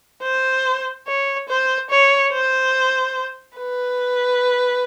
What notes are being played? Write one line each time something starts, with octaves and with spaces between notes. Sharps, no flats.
C5
C#5
C5
C#5
C5
B4